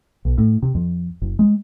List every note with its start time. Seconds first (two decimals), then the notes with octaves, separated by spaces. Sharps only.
0.25 B1
0.38 A2
0.62 C3
0.75 F2
1.22 F#1
1.39 G#3